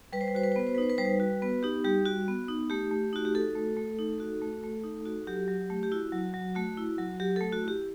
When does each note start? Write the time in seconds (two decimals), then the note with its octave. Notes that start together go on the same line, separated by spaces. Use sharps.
0.13 G3 B4
0.21 C5
0.28 B4
0.35 F#4 C5
0.43 B4
0.52 C5
0.56 B3 B4
0.67 C5
0.74 B4
0.78 D#4 C5
0.90 B4
0.98 G3 C5
1.05 B4
1.20 F#4
1.42 B3 B4
1.63 D#4 G4
1.84 G3 G4
2.05 F#4
2.28 B3
2.48 D#4
2.70 A3 G4
2.91 A3
3.13 D#4 F#4
3.25 G4
3.35 F#4 A4
3.55 A3
3.77 A3
3.99 D#4
4.20 F#4
4.42 A3
4.63 A3
4.84 D#4
5.06 F#4
5.27 F#3 G4
5.48 F#3
5.70 A3
5.83 G4
5.92 E4 F#4
6.12 F#3
6.34 F#3
6.55 A3 F#4
6.77 E4
6.98 F#3
7.20 F#3 G4
7.36 A3 A4
7.52 F#4
7.63 E4
7.68 G4